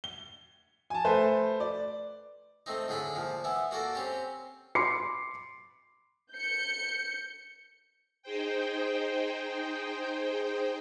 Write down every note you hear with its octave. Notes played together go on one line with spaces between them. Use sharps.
G7
G#5 A5
A3 B4 C5
D5
A3 C4 D#4
A2 D3 G#4 B5
A#2 F3
E3 B3 E4
A#3 F#4 A4 D5
C4 C#4 G4
B5 C6 D6 C7 C#7
G6 C#7
D#4 G#4 C5 G5